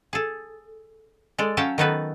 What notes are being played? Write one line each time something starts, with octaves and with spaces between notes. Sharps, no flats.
G#4 A4
G#3 A4 D5
F#3 C#4 F5 G5 A5
D#3 F#3 B3 D#4 A4 B4